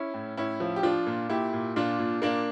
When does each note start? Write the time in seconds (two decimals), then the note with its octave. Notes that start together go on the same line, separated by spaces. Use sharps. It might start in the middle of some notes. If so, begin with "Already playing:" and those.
Already playing: C#4 E4
0.14 A2
0.37 A2 C#4 E4
0.60 F3
0.76 G4
0.83 F3 D4 F4
1.07 A#2
1.29 A#2 E4 G4
1.53 A#2
1.76 A#2 D4 F4
1.99 A#2
2.22 A#2 A#3 D4